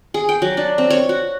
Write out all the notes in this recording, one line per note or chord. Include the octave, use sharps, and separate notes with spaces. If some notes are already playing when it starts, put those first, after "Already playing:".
G#4
G5
F#3
D4
C4
C#5
F#4